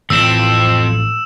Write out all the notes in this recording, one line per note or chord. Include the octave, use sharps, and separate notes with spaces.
F2 A2 E3 A3 C4 E6 E7